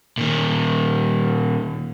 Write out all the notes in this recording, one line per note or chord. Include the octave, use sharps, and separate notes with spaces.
A#2 D#3